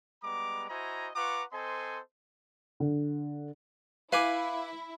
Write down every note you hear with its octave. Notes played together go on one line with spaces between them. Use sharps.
G3 G#3 B3 A#5 D6
E4 F#4 C5 D#5 G#5 A#5
F4 B4 F#5 A#5 C#6 D6
C4 A4 C5 D#5 G#5 C6
D3
E4 B4 F5 G#5 D6